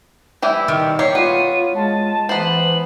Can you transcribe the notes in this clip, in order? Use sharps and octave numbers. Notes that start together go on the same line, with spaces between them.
E3 G3 E4 G6
D#3 G5
G3 C#5 C7
B3 F4 D#7
G#3 A5
E3 B3 C5 F#7